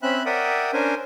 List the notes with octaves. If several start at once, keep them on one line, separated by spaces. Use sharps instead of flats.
C4 C#4 E5 B5 F#6
A#4 D5 E5 F#5 G5 D#6
C#4 D4 A#4 C5 G#5